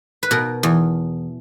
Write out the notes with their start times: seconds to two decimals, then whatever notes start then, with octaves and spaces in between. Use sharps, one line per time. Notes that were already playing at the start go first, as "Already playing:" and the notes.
0.23 B4
0.31 B2 A#4
0.63 E2